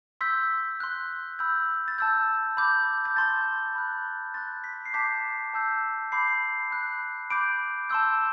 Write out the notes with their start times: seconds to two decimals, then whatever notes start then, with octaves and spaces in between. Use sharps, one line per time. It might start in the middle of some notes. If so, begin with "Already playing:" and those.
0.21 C6 E6 G6 B6
0.80 C6 F#6
1.39 B5 E6 G6
1.88 A6
1.98 A5 E6 G6
2.57 B5 D6 G6
3.05 G6
3.16 A5 C6 G6 A6
3.75 B5 F#6
4.34 C6 F#6 A6
4.64 B6
4.85 C7
4.94 A5 D6 G6 B6
5.54 A5 E6 G6
6.12 B5 D6 G6 C7
6.71 B5 F#6
7.30 B5 D6 G6 D7
7.90 A5 C6 E6 G6